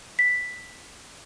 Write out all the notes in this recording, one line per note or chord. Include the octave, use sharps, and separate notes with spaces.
B6